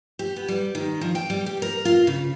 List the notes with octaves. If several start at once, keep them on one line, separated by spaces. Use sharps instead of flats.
G4
B3
G3
D#3
F3
G5
G3
G4
A#4
F4
C#3